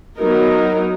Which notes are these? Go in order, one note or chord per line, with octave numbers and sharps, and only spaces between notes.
F#3 B3 D#4 A#4